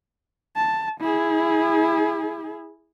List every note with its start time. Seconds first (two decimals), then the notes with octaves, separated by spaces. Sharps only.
0.56 A5
1.00 E4 G#4